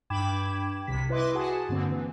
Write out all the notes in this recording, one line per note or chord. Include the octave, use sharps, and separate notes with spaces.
G2 G5 B5 D6 G#6 E7
C2 C3 B6
E4 B4 D#5 E5 C6 D6
F#4 G#4 F#5 G#5 A5
G2 D3 A#3 C4
E3